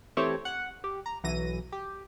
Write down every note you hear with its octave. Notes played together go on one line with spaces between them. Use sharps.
E3 A3 C4 E4 G4 C#5
F#5
G4
A#5
B1 E3 F#3 A#6 D#7
G4